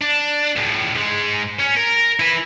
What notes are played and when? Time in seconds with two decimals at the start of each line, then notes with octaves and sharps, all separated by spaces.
0.02 D4
0.56 C#2 A2
0.94 G#2 G#3
1.60 C#4
1.77 A#4
2.19 E4 B4